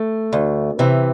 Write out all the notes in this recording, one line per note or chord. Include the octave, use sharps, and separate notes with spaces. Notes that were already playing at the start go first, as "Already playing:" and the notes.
Already playing: A3
D2
C3 E3